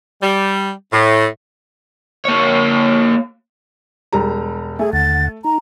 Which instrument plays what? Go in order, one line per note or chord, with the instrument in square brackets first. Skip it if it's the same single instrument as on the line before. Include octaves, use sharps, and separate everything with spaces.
[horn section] G3
A2
[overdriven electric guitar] A#3 C#5
[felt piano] E1 G3 A#5
[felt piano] A3 [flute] G#4 [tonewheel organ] E5 G#5
[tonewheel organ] D#2 D3 F#5 [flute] A6
[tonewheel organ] D#4 [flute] A#5